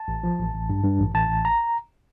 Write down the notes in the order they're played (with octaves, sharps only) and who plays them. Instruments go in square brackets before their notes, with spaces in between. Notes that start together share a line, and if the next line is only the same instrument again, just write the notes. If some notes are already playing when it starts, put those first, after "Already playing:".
Already playing: [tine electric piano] A5
A1
F3
A1
A1
G2
G2
A1
A1 A5
A1
A#5